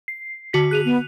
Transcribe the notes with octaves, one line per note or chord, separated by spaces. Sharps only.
C7
D3 F#4 B6
G#4 F#6 D#7 F7
B3